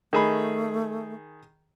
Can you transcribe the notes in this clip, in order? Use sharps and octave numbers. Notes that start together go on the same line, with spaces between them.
D#3 A3 G#4 B5